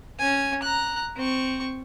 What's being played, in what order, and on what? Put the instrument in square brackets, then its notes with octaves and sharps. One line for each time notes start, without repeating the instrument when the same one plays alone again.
[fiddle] C#4 G#5
A#5 F#6
C4 C#6